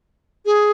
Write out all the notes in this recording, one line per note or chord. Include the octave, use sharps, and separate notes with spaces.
G#4